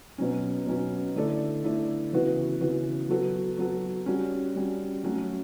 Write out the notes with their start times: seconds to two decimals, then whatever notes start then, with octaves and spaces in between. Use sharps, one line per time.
0.18 B2 F#3 C#4
0.66 B2 F#3 C#4
1.16 D3 A3 E4 A4 D5
1.64 D3 A3 E4 A4 D5
2.13 C#3 E3 B3 F#4 B4
2.61 C#3 E3 B3 F#4 B4
3.09 F#3 B3 F#4 A4
3.58 F#3 B3 F#4 A4
4.06 G3 C#4 F#4
4.55 G3 C#4 F#4
5.03 F#3 A3 C#4 F#4